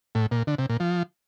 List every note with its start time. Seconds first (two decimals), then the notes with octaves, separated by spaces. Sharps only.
0.15 A2
0.31 A#2
0.47 D3
0.58 C3
0.69 A#2
0.80 F3